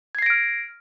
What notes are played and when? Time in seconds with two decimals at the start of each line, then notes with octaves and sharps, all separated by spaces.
0.15 G#6
0.18 C7
0.22 A#6
0.26 D7
0.30 F6